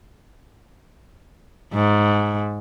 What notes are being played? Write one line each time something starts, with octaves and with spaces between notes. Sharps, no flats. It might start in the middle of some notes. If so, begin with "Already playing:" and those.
G#2